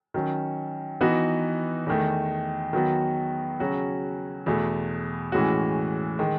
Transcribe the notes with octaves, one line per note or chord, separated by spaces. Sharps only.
D#3 F#3 C#4
E3 B3 D#4 F#4
E2 D#3 A3
D#3 F#3 B3 F#4
C#3 F#3 C#4 F#4
E2 B2 A3
A2 E3 G#3 C#4 F#4
D#3 G#3